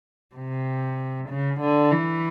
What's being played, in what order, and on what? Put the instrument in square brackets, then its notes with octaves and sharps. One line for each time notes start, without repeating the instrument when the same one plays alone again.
[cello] C3
C#3
D3
E3